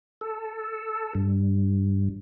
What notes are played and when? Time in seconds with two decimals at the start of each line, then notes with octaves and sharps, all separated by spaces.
0.21 A4
1.15 G2